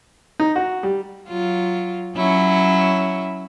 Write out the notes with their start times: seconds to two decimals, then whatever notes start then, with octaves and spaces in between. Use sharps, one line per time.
0.40 D#4
0.56 F#4
0.83 G3
1.28 F#3 F4
2.17 F#3 C#4 E4